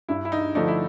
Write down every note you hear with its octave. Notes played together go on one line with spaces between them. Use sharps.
G2 E4
E4
D#4
D3 F3 A3 D4 D#4
E4